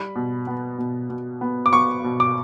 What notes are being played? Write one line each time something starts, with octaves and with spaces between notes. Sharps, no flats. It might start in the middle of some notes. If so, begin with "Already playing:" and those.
Already playing: G3 B5
B2
B3
B2
B2
B3
D6
B3 C#6
B2
D6